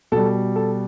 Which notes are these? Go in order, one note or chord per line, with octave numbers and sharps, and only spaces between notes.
B2 G3 A4
A4